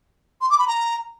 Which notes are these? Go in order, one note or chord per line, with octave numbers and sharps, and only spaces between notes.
C6
D6
B5
A#5